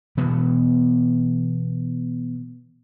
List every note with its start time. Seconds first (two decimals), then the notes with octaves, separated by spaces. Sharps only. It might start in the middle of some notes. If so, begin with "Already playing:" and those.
0.17 B2 E3 B3